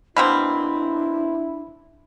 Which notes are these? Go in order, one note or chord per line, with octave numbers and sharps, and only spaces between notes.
B2 A#3 C4 D4 E4 B5